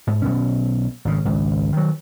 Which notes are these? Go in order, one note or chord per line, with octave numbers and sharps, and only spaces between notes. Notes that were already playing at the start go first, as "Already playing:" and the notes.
G#2
B1 B2 C#4
G#1 C#3
G#1 C#2
D#3 F#3